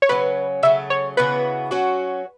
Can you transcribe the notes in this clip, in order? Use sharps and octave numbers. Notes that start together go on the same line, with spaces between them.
C#5
C#3 F#3 C#4 B4
C#3 F#3 A3 E5
C#5
C#3 E3 B3 F#4 B4
F#3 C#4 F#4